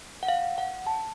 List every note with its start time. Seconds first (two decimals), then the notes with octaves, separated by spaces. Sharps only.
0.23 F#5
0.28 F5
0.58 F#5
0.87 A5